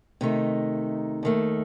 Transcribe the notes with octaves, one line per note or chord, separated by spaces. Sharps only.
C3 D#3 A3 D#4
D#2 D#3 A3